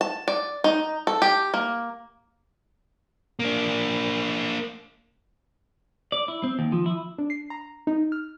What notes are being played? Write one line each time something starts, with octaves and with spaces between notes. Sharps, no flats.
A5
D5
D#4
A4
G4
A#3
A#3 D4
D5
E4
C4
D#2
F3
E4
D4
C7
A#5
D#4
F6